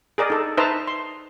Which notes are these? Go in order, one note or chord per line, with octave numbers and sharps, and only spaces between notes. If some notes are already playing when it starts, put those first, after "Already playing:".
G#4 A#4 D5 D#5
D#4 A4
D#4 B4 C5 E5 A5 A#5
C6